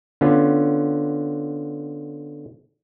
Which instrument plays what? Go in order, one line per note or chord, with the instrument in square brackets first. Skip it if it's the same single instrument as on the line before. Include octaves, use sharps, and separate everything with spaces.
[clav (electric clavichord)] D3 B3 C#4 F4